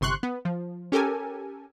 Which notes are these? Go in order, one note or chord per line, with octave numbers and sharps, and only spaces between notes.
G1 C3 C6 C#6 F#6
B3
F3
C#4 G4 A4 A#4 G#5